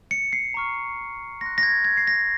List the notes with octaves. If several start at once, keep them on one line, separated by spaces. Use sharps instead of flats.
C#7
C7
A#5 C#6 F6
C6 F#6 A#6
A#6
G#6
G#6
C7
A#6